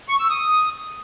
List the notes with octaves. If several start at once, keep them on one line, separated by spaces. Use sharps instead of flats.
C#6
E6
D#6